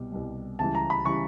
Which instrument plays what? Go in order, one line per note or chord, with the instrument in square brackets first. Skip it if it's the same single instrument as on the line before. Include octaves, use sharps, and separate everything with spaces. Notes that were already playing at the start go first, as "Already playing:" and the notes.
Already playing: [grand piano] C2 B2 G3
C2 B2 G3
C#2 C#3 E3 G3 A5
A#5
B5
C#3 E3 G3 C#6